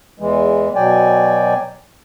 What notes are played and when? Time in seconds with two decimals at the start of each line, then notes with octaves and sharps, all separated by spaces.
0.20 E2 E3 G#3
0.75 B2 F#3 D5 G5 G#5